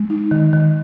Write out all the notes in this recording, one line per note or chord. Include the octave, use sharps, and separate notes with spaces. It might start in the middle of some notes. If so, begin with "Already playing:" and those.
Already playing: G#3
D#4
D#3
D#3